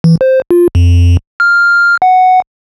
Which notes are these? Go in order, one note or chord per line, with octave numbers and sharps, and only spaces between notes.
E3
C5
F4
F2
F6
F#5